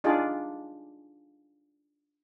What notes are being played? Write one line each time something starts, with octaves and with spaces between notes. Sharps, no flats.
D4 D#4 F4 G#4 D5